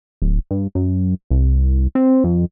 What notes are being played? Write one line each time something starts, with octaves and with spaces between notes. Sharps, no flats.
D1
G2
F#2
C2
C4
F2